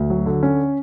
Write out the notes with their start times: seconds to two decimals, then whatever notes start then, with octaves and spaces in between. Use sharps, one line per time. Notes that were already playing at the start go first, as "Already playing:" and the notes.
Already playing: D2
0.10 F#3
0.26 D3
0.43 C#4